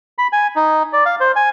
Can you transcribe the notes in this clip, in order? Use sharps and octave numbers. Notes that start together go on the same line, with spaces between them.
B5
G#5
D#4
D5
F5
C5
G#5